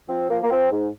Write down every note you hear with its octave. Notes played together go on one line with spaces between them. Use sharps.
F3 C4
F3 A#3
A#3
F3 C4
G#2